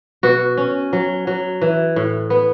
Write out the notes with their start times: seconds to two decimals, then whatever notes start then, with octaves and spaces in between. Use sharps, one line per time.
0.23 B2 F#4
0.57 C#4
0.93 F#3
1.27 F#3
1.62 E3
1.96 A2
2.30 B3